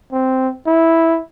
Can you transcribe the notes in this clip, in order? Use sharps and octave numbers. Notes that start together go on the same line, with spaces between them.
C4
E4